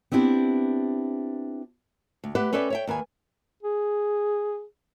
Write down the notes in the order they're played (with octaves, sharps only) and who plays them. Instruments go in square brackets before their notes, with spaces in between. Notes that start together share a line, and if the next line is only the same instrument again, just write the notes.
[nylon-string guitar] B3 C4 D4 E4 G4
D2
G4 B4 E5 F#5
C#4 A4 B4 D5 E5 G5
C#5 E5 G5
D#2 D#3 B4 G#5
[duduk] G#4